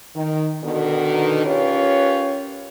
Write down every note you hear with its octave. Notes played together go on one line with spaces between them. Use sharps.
D#3
B2 D3 D#3
C#4 F4 G4 A#4 B4 C#5